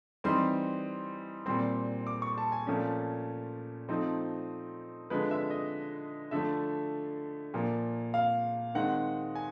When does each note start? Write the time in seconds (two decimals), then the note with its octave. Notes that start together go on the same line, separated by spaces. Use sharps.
0.24 E3 G3 C4 D#4 C6
1.46 A#2 G3 C4 C6
2.07 D6
2.22 C#6
2.38 A5
2.52 G#5
2.67 A#2 F3 A3 C#4
3.89 F3 A3 C4 D#4
5.10 D3 F3 G#3 B4
5.31 E5
5.50 D#5
6.31 D3 F3 A3 E5
7.54 A#2 F3 A#3
8.14 F5
8.75 D#3 G#3 C4 F#5
9.35 G#5